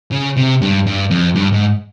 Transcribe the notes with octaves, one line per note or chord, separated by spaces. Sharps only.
C#3
C3
G2
G2
F2
G2
G#2